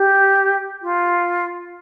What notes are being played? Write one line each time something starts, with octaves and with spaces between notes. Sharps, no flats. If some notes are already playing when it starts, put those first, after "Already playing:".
Already playing: G4
F4